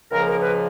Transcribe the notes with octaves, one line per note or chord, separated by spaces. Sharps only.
C#2 C#3 F3 A#3 A#4
A#4
B4